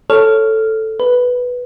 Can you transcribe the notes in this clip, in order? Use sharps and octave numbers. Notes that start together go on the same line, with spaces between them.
A4 C#5 F6
B4